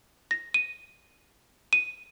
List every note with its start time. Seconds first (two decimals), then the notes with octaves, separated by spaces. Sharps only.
0.31 A#6
0.54 D#7
1.73 D#7